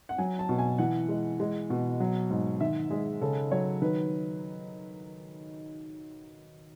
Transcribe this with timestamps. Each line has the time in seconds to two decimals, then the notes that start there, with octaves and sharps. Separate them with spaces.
0.09 F#5
0.18 F#3 G#5
0.39 A5
0.49 B2
0.59 G#5
0.78 E3 F#5
1.09 G#3
1.40 G#3
1.70 B2
2.00 F#3
2.30 G#2
2.60 D#3 E5
2.91 G#3 G#4
3.21 C#3 A4
3.51 F#3 C#5
3.82 D#3 B4